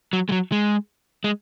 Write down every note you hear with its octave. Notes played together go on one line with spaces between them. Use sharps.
F#3
G#3
F#3
G#3
G#3